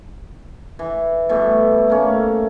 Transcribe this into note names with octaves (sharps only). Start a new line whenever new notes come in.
E3
B2 E3 G3 A3
A3 A#3 C#4